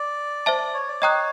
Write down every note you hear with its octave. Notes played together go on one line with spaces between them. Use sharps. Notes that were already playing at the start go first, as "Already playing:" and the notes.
Already playing: D5
C5 E5 A5
C#5
D5
C#5 D#5 G5 A#5 D#6 F#6